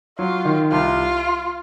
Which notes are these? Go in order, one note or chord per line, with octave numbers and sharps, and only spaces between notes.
F#3 F4
D#3
C2 F4